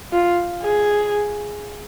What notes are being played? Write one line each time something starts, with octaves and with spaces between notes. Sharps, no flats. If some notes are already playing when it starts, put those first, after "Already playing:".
F4
G#4